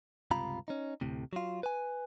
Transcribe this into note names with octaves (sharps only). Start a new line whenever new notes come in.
C#2 G2 C3 F4 A#5 B5
C#4 D#4
D2 A2 C3
F#3 F4
B4 G#5